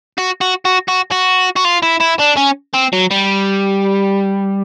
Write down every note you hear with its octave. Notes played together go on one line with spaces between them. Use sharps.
F#4
F#4
F#4
F#4
F#4
F#4
F4
E4
E4
D4
C#4
C4
F#3
G3